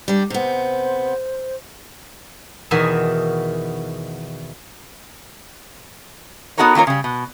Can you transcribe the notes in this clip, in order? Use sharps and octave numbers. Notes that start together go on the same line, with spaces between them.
G3 D4
C3 B3 C5
E2 B2 D#3 F#4 E5 G#5
B3 D#4 F#4 A4 A#4 C#5
D#3 A#3 F4 A#4 C#5
C#3 G3
B2